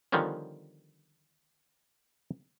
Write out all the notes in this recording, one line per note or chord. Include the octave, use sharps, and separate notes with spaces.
D3 D#3 F3 G3 B3 C#4